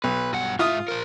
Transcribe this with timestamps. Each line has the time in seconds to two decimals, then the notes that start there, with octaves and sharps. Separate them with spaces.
0.04 B1 B4
0.33 G2 F#5
0.59 G#2 F4 E5 F5 D#6
0.88 A#4 C5